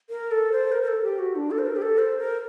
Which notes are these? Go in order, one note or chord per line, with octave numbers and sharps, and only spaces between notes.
A#4
A4
C5
A#4
A#4
A4
G4
F#4
D4
A4
C5
A#4
G4
A4
C5
A#4